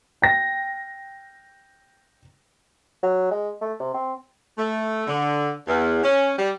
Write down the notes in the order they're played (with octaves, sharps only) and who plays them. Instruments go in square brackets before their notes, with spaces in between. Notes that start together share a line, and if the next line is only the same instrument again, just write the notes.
[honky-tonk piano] G5 A#6
[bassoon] F#3
G#3
A3
C3
C4
[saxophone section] A3
D3
E2
C#4
G3